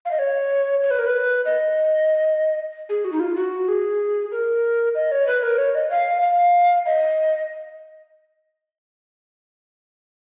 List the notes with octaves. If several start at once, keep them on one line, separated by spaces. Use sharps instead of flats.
F5
D#5
C#5
C#5
B4
A#4
B4
D#5
G#4
F#4
D#4
F4
F#4
G#4
A#4
D#5
C#5
B4
A#4
C#5
D#5
F5
F5
D#5